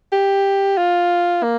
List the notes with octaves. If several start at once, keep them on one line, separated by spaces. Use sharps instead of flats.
G4
F4
A#3